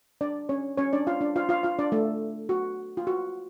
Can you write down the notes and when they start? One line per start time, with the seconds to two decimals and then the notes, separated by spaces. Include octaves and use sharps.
0.21 D4 D5
0.49 C#4 C#5
0.78 C#4 C#5
0.93 D4 D5
1.07 F4 F5
1.21 D4 D5
1.36 F4 F5
1.49 F4 F5
1.63 F4 F5
1.79 D4 D5
1.92 A3 A4
2.49 F#4
2.97 F4
3.07 F#4